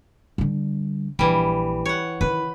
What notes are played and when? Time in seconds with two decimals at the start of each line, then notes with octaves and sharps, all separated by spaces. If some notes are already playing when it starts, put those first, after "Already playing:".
0.38 D3 G3
1.19 A#1 E3 G3
1.85 C#5 F#5
2.21 D#3 E4 B4